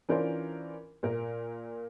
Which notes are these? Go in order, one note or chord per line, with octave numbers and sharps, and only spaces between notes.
E3 C#4 D4 F4 A#4 C5
A#2 A#4